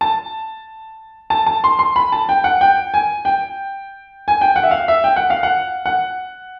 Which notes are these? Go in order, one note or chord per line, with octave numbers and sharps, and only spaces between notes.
A5
A5
A5
C6
C6
B5
A5
G5
F#5
G5
G#5
G5
G#5
G5
F#5
E5
F5
E5
G5
F#5
F5
F#5
F#5